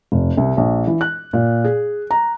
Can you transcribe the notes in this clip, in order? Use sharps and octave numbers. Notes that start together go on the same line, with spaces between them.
F1
C2
A#1
E3
F#6
A#2
G#4
A#5